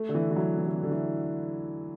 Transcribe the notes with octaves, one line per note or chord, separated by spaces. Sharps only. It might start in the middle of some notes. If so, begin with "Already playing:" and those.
Already playing: A3
D3
E3
E3
F#3
E3
D3
E3
D3
E3